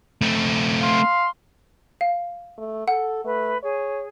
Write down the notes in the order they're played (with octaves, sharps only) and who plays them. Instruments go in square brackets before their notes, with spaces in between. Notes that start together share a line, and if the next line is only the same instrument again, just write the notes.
[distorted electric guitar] A3 C4
[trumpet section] F5 C6
[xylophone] F5
[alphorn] A3
[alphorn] A4 [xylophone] F#5
[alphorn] A3 [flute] B4
[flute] G#4 [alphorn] C#5